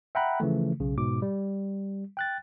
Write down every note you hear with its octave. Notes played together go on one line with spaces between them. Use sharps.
E5 F#5 G5 A#5 B5 F#6
C#3 E3 F3 A3
B1 C#3
G#2 B2 D6
G3
G5 F#6 A6